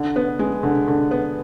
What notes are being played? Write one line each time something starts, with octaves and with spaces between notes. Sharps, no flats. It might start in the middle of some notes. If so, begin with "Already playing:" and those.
Already playing: D3
B3
G#3
D3
D3
B3